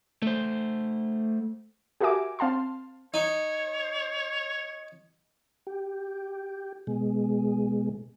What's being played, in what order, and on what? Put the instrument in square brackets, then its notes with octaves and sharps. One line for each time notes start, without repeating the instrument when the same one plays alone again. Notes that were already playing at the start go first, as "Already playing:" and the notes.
[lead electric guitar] A3 C5
[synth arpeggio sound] F#4 G4 A#4 E5 G#5 D6
C4 F5 A5 C6
[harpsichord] D#4 [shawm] C#5
[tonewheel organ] G4
B2 G#3